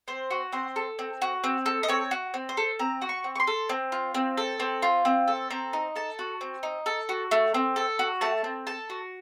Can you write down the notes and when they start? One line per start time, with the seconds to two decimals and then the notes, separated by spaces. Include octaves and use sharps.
0.08 C4 C5
0.31 F#4
0.52 C4 C5
0.76 A4
0.99 C4
1.22 F#4
1.44 C4
1.66 A4
1.83 D#5
1.88 C4 C#5
2.11 F#4
2.34 C4
2.49 C5
2.57 A4
2.79 C4 A#5
3.02 F#4
3.09 C#6
3.24 C4
3.36 C#6
3.40 C6
3.47 A4
3.69 C4
3.92 F4
4.15 C4
4.38 A4
4.60 C4
4.82 F4
5.05 C4
5.28 A4
5.50 C4 A#5
5.73 D#4
5.96 A4 A5
6.19 F#4
6.41 C4
6.63 D#4
6.86 A4
7.09 F#4
7.31 A3
7.54 C4
7.76 A4
7.99 F#4
8.21 A3 A5
8.44 C4
8.67 A4 A5
8.90 F#4